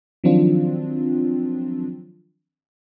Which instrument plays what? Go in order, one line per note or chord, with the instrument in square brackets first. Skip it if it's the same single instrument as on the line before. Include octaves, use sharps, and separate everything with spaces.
[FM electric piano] D#3 F3 F#3 C4 D4 F4